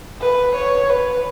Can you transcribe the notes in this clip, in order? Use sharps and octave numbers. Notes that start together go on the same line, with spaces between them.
B4
C#5
B4